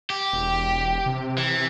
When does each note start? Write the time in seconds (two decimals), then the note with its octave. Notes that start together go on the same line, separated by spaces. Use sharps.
0.10 G4
0.33 E1
1.06 C3
1.38 E3